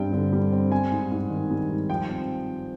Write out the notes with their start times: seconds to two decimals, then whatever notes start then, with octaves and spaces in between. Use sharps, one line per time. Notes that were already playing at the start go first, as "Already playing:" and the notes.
Already playing: G2 G3 C4 G5
0.13 D3
0.33 G3
0.52 C4
0.72 G3 G#5
0.92 G#2
1.11 G#2
1.30 D#3
1.51 G3
1.70 G#2
1.90 F3 G5
2.09 C4